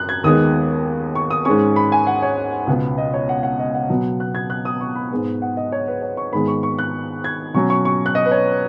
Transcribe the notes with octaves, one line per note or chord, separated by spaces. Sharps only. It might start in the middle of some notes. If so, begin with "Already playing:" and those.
Already playing: F#2 F#6
G#6
D#2 D#3 G#3 B3 D#6
C#6
D#6
G#2 G#3 C#4 C#6
B5
G#5
F#5
C#5
C#2 B2 B3
D#5
C#5
F#5
F#5
D#5
F#5
B2 F#3 B3
F#6
G#6
F#6
D#6
C#6
B5
G#2 G#3 B3
F#5
D#5
C#5
B4
C#5
C#6
G#2 D#3 G#3 B3 B5
C#6
C#6
F#6
G#6
B2 F#3 C#4 C#6
C#6
C#6
F#6
D#5
B4
C#5